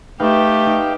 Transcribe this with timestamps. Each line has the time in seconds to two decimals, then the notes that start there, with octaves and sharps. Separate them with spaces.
0.20 A3 D#4 G4 B4 F5 G5
0.67 D#4